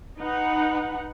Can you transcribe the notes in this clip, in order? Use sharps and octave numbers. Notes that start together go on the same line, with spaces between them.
D#4 B4 F#5